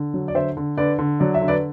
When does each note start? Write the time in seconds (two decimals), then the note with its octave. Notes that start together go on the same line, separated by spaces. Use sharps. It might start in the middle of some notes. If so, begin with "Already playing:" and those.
Already playing: D3
0.14 F#3
0.28 D5
0.34 D3 C5 E5
0.57 D3
0.77 D3 B4 D5
0.99 D3
1.20 F#3 D5
1.34 E5
1.41 D3
1.48 B4 D5